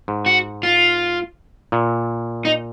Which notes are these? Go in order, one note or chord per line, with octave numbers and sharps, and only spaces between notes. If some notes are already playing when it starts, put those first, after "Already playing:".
G#2
F#4
F4
A#2
D#4